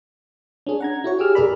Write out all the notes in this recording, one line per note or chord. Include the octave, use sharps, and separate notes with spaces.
C#4 D4 G#4
F#5 A#5 G#6
E4 F#4 C#5
G4 G#4 D6 E6 F6
G1 A2 G#4 A#4 D5 B5